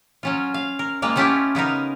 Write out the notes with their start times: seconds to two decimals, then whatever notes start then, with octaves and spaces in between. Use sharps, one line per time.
0.23 F#3 C#4 F4
0.54 F5
0.79 A#4
1.02 G3 G#3 A#3 F4 A#4
1.16 A3 B3 C#4 E4 F4 G4
1.55 C#3 B3 D#4 A#4